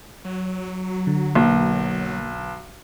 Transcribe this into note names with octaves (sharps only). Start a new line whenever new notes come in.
F#3
D3
B1 A#3